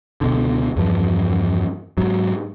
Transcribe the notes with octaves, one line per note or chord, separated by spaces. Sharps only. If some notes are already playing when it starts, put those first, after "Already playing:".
C#2 B2 D3
E2 G2 F3
G#2 F#3